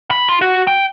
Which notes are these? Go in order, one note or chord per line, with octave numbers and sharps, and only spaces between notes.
B5
F4
F#4
G5